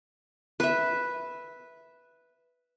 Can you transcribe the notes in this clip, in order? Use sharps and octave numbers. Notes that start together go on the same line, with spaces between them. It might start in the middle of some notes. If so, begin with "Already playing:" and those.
B4 E5